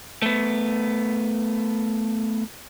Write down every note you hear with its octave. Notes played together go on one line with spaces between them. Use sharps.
A3 B3